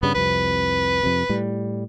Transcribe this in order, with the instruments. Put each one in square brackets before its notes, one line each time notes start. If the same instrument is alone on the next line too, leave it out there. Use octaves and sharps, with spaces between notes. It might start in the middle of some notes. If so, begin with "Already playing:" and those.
[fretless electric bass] G2 C#3 G3 [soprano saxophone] B3
[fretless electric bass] C2 F2 C3 [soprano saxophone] B4
[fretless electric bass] F2 C3
A2 G3